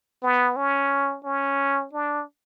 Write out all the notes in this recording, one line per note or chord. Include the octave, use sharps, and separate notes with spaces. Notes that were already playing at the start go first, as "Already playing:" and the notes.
B3
C#4
C#4
D4